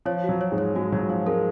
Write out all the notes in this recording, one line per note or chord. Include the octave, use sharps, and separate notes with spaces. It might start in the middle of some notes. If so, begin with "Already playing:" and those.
F3 C#5
F#4
F#3
C#5
G#2 G#3
C#5
G#2 G#3 F#4
F#3 C#5
F3 C#5
G#3 A#4